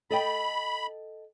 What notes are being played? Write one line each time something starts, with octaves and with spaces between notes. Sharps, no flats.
A4 D#5 G5 B5